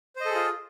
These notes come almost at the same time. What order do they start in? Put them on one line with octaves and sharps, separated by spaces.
C5 D#5 A4 G#4 F4